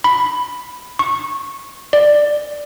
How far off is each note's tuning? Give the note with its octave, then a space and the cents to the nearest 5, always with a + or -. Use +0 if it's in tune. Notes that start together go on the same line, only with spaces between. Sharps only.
B5 +5
C#6 -20
D5 +10